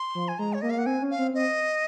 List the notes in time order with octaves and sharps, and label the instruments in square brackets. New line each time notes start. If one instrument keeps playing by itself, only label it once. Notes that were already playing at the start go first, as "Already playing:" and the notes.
Already playing: [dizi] C6
[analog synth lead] F3
[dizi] G#5
[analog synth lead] G#3 [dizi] A#5
[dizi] C#5
[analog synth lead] A#3 [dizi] D#5
[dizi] F5
[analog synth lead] A#3 [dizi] F#5
[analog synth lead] C4 [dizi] G#5
[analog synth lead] C#4
[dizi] F5
[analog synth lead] C4
[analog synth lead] C4 [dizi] D#5